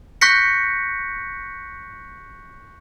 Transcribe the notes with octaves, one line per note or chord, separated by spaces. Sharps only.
C#6 F#6 G6 A#6 B6 C#7